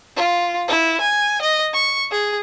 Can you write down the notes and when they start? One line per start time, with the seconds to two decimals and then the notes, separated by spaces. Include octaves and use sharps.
0.16 F4
0.68 E4
1.01 G#5
1.42 D#5
1.73 C#6
2.11 G#4